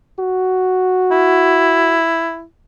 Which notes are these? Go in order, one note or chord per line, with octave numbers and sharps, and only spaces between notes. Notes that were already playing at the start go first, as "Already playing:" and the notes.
F#4
E4